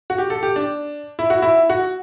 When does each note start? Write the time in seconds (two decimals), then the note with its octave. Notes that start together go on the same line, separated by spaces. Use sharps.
0.10 F#4
0.18 G4
0.30 A4
0.43 G4
0.56 D4
1.19 E4
1.30 F#4
1.42 E4
1.70 F#4